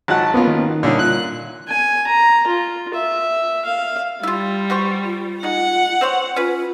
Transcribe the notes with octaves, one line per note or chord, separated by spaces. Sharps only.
G#1 F#3 F#5 A5
A#3 B3 C#4 F4
D#3
A#2 D3 G3 C#4 D#4 E4
A#2 F#6
G#5
A#5
F4
E5
F5
G3 E4 F4
F#4 C5 C#6
F4
G#3 D#4 F#5
C4 C5 C#5
C#4 F4 B4